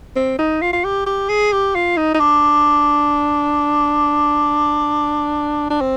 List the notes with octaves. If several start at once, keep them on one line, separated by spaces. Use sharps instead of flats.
C4
D#4
F4
F4
G4
G4
G#4
G4
F4
D#4
D#4
D4
D4
C4